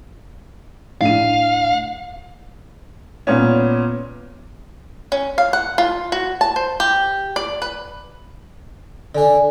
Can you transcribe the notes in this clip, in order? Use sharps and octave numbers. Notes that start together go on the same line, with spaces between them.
A2 D4 F5 D#7
A#2 B3 C#4
C#4
F5
F#5
F4
F#4
A5
C5
G4
D5
B4
D3 D4 D5 G#5